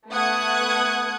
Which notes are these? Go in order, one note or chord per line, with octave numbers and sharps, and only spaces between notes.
A3 B3 F#5 D#6 F#6 G#6